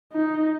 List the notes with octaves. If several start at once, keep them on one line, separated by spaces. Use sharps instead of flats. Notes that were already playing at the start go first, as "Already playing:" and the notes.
D#4